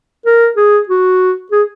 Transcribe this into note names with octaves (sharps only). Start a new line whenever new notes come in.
A#4
G#4
F#4
G#4